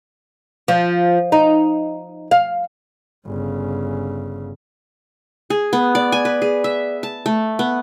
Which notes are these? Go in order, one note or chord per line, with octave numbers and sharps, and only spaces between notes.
F3
D#4
F5
G1 C#3
G#4
B3
D5
G#5
B4
G#4
E5
A5
A3
B3